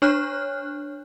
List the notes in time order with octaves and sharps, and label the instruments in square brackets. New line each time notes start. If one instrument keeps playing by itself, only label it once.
[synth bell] D4 C#5 F6 F#6